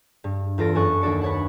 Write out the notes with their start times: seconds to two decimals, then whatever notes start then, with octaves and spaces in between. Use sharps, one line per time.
0.24 G2
0.58 E2 F4 A4 A#6 D7
0.75 F#2 A4 G#5 C#6 F#6
1.01 D#2 D4 F#4 A4 D5 C#7
1.21 B4 C#5 F#5